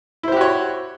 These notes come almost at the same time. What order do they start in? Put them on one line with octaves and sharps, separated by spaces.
E4 C5 G4 F#4 C#5